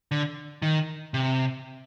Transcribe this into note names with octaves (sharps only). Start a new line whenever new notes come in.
D3
D#3
C3